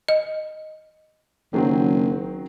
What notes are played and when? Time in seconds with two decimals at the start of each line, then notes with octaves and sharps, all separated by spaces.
0.09 D#5
1.53 F#1 D#3 F#3 C4